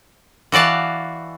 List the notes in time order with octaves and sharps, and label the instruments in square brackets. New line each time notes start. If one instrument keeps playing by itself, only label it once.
[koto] E3 F#4 D5 F5 A5